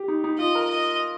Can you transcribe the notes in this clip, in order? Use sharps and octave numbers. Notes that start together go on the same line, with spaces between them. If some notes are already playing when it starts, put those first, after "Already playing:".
Already playing: G4
D#4
D#4
F4 D#5
A#4
D#5